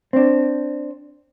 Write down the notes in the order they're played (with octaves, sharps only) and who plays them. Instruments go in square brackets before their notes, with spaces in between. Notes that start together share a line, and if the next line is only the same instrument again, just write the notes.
[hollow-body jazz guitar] C4 D4